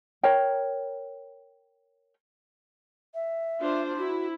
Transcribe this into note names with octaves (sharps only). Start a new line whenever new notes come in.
A#4 C#5 G5
E5
D4 F4 C5
E4 F#4